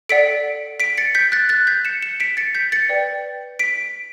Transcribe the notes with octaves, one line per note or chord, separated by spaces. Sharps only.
A4 D5 F#5 B6 D7
B6 D7
A6 C#7
G6 B6
F#6 A6
F#6 A6
G6 B6
C#7 E7
C#7 E7
B6 D7
A6 C#7
G6 B6
A6 C#7
B4 D5 G5
B6 D7